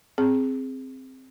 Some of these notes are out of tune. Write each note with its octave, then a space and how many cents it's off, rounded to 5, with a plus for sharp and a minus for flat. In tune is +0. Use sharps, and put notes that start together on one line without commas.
C4 +0 G#4 +0